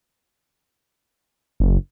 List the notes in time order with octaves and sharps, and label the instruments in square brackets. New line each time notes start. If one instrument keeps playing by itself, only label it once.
[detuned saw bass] F#1